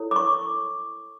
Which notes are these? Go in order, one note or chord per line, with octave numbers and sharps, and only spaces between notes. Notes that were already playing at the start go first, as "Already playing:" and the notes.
Already playing: E4 A4 C#5
D6
C#6